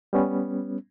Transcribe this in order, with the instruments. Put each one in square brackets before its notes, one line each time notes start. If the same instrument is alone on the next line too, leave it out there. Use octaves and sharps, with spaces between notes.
[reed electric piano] G3 B3 C#4